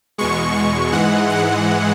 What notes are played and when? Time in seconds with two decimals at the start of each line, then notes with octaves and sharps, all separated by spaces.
0.18 E2 B2 G#3 C#6
0.56 C#6
0.92 G#2 E3 G#3 F#5
1.30 F#5